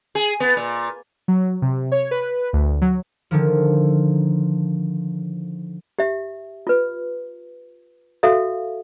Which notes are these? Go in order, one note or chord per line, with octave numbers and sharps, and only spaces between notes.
G#4
B3
A#2
F#3
C3
C#5
B4
D2
F#3
D3 D#3 F3
G4 E5
F4 B4
F#4 A4 E5 F5